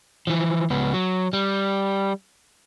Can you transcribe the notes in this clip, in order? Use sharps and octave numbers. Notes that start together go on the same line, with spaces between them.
E3 F3
C#2 B3
F#3
G3